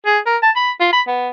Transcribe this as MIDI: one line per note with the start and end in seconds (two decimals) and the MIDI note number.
0.06 0.19 68
0.26 0.37 70
0.43 0.51 81
0.56 0.71 83
0.80 0.88 65
0.93 1.02 83
1.07 1.30 59